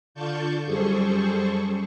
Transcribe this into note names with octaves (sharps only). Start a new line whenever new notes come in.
D3 F4 D5 A5 C#6 G6
F#2 G3 G#4 A4 C5 C#6